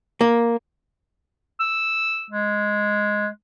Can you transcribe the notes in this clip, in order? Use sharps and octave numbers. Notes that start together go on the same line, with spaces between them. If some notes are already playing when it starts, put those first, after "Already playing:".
A#3
E6
G#3